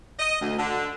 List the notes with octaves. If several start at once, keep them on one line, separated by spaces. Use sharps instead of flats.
D#5
D2
D3